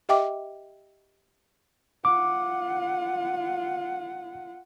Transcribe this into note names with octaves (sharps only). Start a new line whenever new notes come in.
G4 D#5 E5 G5 D6
F4 F#5 D6